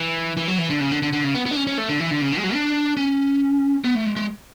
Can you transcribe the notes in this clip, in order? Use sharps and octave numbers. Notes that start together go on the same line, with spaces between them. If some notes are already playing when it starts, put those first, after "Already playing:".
Already playing: E3
E3
F#3
E3
D3
C#3
D3
D3
D3
C#3
B3
B3
D4
C#4
C#4
A3
D3
E3
D3
C#3
D3
G#3
F#3
D4
C#4
B3
A3
G#3
G#3